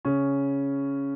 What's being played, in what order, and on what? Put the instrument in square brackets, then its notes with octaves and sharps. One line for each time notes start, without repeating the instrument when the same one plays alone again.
[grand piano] C#3 C#4